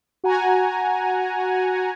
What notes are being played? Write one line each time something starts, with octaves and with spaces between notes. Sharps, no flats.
F#4 F#5 G#5 A#5